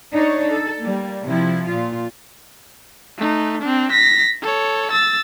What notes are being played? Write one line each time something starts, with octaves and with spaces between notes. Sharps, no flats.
D4 D#4 C#5
A4
G3 A#3
C3 F3 E4
A#2 F4
A3 D#4
C4 D4
A#6 B6
A4 C#5
E6 A6